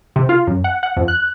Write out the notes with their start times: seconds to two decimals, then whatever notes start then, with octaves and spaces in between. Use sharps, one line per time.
0.16 C3
0.29 F4
0.47 F#2
0.64 F#5
0.83 F#5
0.97 F2
1.08 F#6